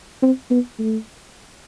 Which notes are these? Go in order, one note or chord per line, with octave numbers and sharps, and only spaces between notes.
C4
B3
A3